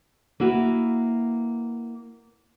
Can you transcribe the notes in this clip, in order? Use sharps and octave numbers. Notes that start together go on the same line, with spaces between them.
A#3 E4 F#4 B4